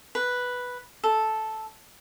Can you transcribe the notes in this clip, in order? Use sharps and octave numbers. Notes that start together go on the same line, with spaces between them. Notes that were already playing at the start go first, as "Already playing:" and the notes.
B4
A4